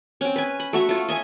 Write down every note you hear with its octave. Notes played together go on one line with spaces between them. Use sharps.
C4 C#4
B4 G#5
B5
A3 F#4 E5
A3 F4
D#5 E5 G#5